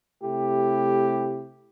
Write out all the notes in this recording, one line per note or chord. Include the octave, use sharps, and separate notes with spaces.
C3 A3 E4 G4